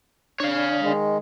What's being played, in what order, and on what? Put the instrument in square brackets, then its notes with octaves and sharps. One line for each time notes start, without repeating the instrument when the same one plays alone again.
[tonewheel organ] D4 [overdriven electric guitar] C#5 F5
[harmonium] D#3 G#3